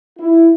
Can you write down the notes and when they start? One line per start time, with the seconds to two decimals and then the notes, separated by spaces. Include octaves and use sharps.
0.19 E4